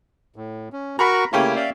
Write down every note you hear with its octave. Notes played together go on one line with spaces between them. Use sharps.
A2
C#4
F#4 A#4 A#5 B5 C#6
C#3 A3 A#3 C#4 E4 G4
D5 E5 F5